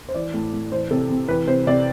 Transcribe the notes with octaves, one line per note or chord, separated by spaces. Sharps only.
C5
E3 D5
A2
A2
E3 C5
C3 A4
C3
E3 B4
C3 C5
C3 D5